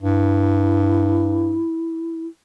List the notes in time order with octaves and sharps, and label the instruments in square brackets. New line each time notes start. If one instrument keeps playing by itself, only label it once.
[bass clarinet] G2 [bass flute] E4